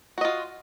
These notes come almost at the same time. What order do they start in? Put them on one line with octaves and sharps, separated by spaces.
F#4 D#5 F4